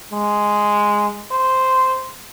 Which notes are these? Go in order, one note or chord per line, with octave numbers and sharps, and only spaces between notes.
G#3
C5